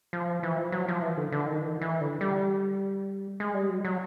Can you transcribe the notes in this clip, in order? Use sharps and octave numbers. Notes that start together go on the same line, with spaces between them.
F3
E3
F3
F#3
F3
E3
D3
D3
D#3
E3
E3
D3
G3
G#3
G3
F#3
F#3